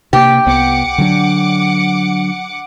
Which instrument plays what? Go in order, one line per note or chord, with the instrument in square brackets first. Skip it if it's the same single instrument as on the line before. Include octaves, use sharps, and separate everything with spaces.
[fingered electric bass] C3 A#3 [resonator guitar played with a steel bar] G4
[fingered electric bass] C2 B3 [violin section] F#5 D6 C#7
[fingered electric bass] D3 F#3 D4